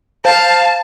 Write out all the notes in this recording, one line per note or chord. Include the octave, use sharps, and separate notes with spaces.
C5 F5 A5